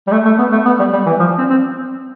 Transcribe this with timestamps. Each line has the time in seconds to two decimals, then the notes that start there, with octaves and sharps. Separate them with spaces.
0.07 G3
0.12 A3
0.25 A3
0.39 B3
0.52 A3
0.65 B3
0.79 G3
0.93 G3
1.06 E3
1.19 F3
1.38 C4
1.50 C4